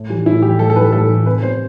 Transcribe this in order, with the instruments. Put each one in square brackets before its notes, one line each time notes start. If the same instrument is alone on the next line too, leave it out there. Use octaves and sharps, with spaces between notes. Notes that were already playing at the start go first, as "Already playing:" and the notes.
Already playing: [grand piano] A2
E3 G3
A2 E4
E3 G3 G4
A2 A4
A4
E3 G3 B4
A2 A4
E3 G3
C3 B4
G3 B3 C5